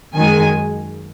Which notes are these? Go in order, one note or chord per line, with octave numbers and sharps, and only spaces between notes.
F#2 D#3 G#3 G#5